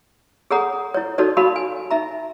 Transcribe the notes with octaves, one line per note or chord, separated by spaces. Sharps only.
G#4 A4 C#5 F#5 A#5 D#6
E4 C#5
D#4 F#4 A4 C#5 D5
D#4 F#4 A#4 F5 A5 B5
G#5
D#4 E5 A#5